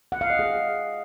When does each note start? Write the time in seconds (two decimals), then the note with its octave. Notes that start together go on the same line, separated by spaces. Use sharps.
0.12 F#5
0.21 F5
0.30 D#5
0.39 G#4